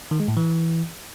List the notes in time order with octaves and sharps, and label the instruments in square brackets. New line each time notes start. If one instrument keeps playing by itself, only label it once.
[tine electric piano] D#3
G#3
A2
E3